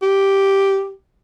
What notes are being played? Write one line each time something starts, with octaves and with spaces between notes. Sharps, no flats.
G4